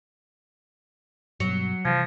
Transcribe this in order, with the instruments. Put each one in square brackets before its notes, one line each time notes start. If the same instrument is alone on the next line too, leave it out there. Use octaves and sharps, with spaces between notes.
[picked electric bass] G2 B2 [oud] F#3 [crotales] C#7
[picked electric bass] C3 E3 [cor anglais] F3 [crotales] G#6 A#6